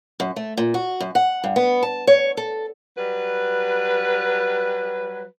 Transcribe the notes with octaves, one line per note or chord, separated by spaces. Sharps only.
F#2
A3
A#2
F#4
F#2
F#5
G2
B3
A5
C#5
A4
F#3 G3 B4